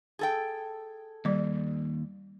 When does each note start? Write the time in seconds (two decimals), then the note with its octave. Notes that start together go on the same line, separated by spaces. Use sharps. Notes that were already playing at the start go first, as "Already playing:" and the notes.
0.19 G#4 A4 G5
1.25 D#2 G3 D5